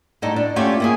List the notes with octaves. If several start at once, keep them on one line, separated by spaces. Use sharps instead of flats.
A2 G3 D#4 A4
D4
A3 C#4 F4 G4 A4 C#5
A#3 E4 G#4